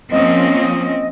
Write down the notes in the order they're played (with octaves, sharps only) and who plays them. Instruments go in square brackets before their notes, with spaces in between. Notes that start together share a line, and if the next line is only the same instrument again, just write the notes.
[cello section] F3 A#3 C#4 [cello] C4 [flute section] D#5